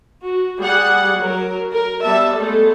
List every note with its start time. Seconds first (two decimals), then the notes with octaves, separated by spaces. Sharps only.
0.23 F#4
0.60 G3 G#4 F#5
1.18 F#3 A#4
1.72 A#4
2.04 G3 B3 E5 A5
2.36 G#3 A3 B3 A4